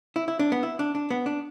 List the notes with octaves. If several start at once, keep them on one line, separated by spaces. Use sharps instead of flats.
E4
E4
D4
B3
E4
D4
D4
B3
D4